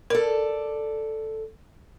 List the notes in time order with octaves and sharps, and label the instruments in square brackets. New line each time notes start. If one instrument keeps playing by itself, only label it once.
[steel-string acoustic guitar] A4 D5 [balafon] A#4